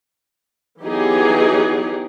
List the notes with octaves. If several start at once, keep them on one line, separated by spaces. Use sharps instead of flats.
E3 F#3 B3 D#4 G4 G#4